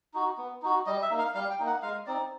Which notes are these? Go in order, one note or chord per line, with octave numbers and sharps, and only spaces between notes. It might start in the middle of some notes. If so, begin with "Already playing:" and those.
D#4 F#4
B3
D#4 F#4
G3 D#5
E5
A#3 D#4
F5
G3 F5
G5
A#3 D#4
F#5
G#3 F5
C4 D#4 D5